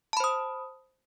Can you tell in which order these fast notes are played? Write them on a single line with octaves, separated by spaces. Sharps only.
A5 B5 C5 D#6